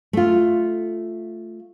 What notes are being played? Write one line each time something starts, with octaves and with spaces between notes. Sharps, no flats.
A3 F4